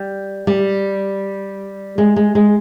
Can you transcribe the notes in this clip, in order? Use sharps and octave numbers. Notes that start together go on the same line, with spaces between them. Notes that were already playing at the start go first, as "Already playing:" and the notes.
Already playing: G3
G3
G#3
G#3
G#3